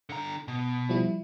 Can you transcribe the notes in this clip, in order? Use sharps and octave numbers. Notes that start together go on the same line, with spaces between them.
D3 A#5
B2
F3 G3 E4